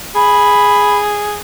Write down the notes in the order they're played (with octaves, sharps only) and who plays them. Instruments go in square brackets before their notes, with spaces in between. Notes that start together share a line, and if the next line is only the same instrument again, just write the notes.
[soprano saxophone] G#4 [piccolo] B5